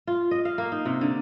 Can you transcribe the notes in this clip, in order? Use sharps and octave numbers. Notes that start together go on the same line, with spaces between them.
F4
D#5
F5
A#3
D#4
C3
D3